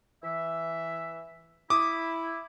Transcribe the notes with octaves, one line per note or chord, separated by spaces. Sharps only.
E3 E5
E4 D6 D#6